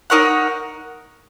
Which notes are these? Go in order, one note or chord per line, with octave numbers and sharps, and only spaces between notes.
D#4 A#4 C#5 F#5